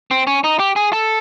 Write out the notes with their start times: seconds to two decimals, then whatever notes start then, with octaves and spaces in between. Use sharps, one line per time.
0.11 C4
0.27 C#4
0.44 D#4
0.59 G4
0.76 G#4
0.93 A4